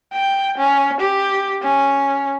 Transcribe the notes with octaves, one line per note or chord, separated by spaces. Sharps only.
G5
C#4
G4
C#4